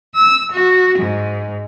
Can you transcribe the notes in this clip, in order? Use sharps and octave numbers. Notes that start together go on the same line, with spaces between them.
E6
F#4
G#2